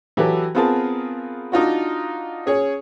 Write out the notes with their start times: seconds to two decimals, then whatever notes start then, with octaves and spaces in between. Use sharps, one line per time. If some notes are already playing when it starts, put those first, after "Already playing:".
0.17 E3 F#3 G4 A4 B4
0.55 B3 C4 F4 G#4 A#4 A5
1.52 D4 D#4 F4 F#4
2.46 C#4 G#4 C#5